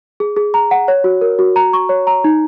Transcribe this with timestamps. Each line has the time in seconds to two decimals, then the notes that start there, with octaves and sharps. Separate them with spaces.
0.20 G#4
0.36 G#4
0.54 A#5
0.71 F#5
0.88 C#5
1.04 F#4
1.21 A#4
1.39 F#4
1.56 A#5
1.73 C#6
1.89 C#5
2.07 A#5
2.24 D#4